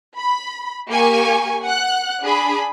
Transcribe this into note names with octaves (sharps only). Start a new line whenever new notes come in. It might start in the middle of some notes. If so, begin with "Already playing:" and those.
B5
A#3 G4 G#5 C#6
F#5 F#6
D4 G#4 B5